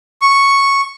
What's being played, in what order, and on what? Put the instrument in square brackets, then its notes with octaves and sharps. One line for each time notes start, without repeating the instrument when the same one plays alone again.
[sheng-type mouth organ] C#6